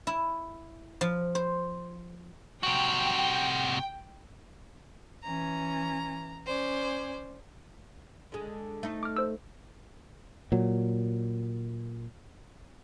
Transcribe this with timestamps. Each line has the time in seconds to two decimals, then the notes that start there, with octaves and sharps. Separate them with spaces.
0.07 E4
1.01 F3
1.35 C5
2.63 C3 F#4 G5
5.23 E3 C#4 A#5
6.46 C#4 C5 D5
8.32 D3 G#3
8.83 A3 D#4
9.03 D6 F6
9.17 C5 E6
10.52 A#2 F#3